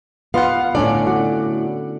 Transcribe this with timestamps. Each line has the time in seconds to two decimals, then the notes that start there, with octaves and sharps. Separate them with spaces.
0.34 B3 F4 F5 F#5
0.75 A2 D3 C#4 D5
1.07 F#4